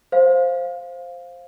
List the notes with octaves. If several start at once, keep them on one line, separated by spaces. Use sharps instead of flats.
C5 F5